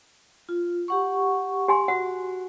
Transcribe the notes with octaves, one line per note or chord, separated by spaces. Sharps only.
F4
G4 F#5 C#6
G4 G#5 C6
F#4 F#5